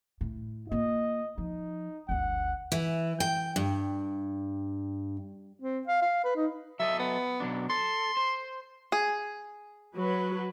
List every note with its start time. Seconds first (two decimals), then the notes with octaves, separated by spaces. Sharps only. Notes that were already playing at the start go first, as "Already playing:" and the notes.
0.21 A2
0.72 A#3 F4 D#5
1.38 F3 D#4
2.09 G1 D2 F#5
2.72 E3
3.20 G5
3.56 G2
5.60 C4
5.87 F5
6.02 F5
6.24 B4
6.36 D#4
6.80 F#3 A4 D#5 E5
6.99 B3
7.40 B2 F#3 D4
7.70 A4 C6
8.17 C5
8.92 G#4
9.96 F#3 B4